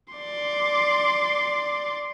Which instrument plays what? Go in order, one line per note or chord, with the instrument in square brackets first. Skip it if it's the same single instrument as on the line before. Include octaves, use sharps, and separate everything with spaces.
[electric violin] D5 C6